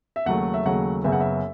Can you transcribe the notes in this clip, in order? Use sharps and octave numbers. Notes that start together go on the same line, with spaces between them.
E5
D#2 C#3 F#3 A3 F#5
E5
D#2 C#3 F#3 A3 F#5
F#1 F#2 C#3 F#3 B3 E5
F#5
E5